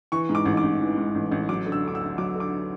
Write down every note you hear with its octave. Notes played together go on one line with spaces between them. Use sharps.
E3 C#6
G#2
D6
A1
D6
A1
E3
G#2
A1
A1
F#3 D6
D3
E6
D2 D6
E6
D2
F#3 D6
D3 D6